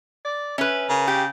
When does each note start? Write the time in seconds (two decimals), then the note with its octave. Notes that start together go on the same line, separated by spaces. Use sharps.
0.25 D5
0.58 C#4 B4 E5
0.89 C#3 A#4
1.08 G4 G5